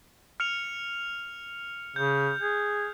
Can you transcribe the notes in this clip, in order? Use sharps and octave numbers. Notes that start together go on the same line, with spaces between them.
F6 C#7 F7
C#3 G6
G#4